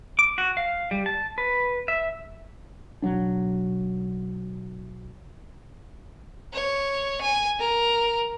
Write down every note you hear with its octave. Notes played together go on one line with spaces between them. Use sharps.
D6
F#4
F5
G3
A5
B4
E5
B1 F#3 D4
C#5
G#5
A#4